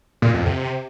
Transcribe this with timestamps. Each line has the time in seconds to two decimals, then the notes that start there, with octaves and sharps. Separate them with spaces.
0.22 A#2
0.34 F2
0.46 C3